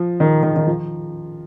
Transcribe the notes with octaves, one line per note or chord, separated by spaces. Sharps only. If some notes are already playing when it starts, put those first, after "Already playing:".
Already playing: F3
D#3
D#3
D#3
F3